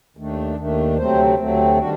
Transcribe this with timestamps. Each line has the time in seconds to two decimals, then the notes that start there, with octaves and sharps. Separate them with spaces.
0.17 D#2 D#3 A3 D4
0.56 D#2 D#3 A3 D4
0.97 D2 C3 F#3 A3 C4 C5
1.38 D2 C3 F#3 A3 C4
1.78 D#3 G3 D4 F#4